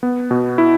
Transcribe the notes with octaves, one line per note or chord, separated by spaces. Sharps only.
B3
B2
E4